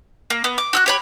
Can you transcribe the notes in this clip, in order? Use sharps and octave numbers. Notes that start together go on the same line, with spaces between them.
A#3
B3
D6
F#4 E6 F#6
G4 C#5 B5